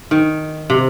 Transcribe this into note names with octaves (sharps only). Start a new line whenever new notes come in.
D#3
C3